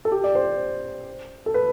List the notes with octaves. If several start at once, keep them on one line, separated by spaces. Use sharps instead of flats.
A4
G4
D5
C5
A4
B4